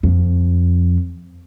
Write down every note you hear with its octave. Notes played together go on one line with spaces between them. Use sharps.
F2